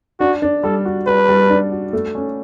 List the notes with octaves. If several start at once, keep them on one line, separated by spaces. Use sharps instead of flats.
D4 F#4
D4
G3 A4
F#4
G3 B4
G3
D4
F#4
A3
C#4